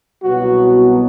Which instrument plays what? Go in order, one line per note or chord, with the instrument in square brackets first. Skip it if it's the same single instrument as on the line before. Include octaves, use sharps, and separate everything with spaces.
[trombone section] C2 B2 F#3 B3 F#4